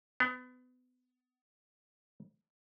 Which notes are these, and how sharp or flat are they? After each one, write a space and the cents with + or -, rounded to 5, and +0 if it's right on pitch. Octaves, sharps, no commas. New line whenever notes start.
B3 +30